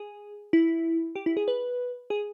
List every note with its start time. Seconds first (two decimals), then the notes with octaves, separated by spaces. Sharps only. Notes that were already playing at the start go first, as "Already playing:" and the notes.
Already playing: G#4
0.53 E4
1.15 G4
1.26 E4
1.37 G#4
1.48 B4
2.10 G#4